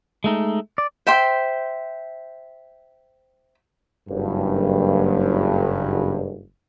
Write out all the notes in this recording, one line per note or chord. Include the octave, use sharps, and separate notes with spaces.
G#3 A3 D#4
D5
C5 E5 G5 C6
F#1 G2